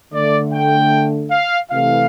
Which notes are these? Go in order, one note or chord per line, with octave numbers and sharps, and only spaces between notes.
D3 A3 D5
G5
F5
C3 E3 A3 F5